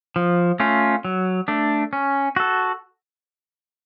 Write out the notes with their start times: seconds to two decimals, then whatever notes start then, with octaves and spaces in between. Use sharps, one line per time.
0.16 F3
0.60 A3 C#4 F4
1.05 F#3
1.48 A3 D4
1.93 C#4
2.36 F#4 A4